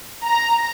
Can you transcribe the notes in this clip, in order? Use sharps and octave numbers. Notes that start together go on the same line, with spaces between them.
A#5